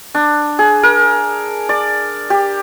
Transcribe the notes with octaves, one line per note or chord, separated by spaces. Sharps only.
D4
G#4
A#4
D5
G4